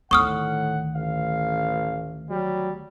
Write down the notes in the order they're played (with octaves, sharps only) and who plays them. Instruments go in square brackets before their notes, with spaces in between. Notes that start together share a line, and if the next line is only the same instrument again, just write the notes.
[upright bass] D2 D#3 [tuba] A2 [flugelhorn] F#5 [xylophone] C#6 D#6 F6
[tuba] A1 [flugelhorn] F5
[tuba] F#3 [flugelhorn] G3